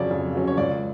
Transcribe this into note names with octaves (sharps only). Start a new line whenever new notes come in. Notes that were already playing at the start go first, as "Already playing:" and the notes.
Already playing: F2 C#3 F#3 C#4 C#5 D5
F2
C#3 F#3 C#4
C#5
C#2 D5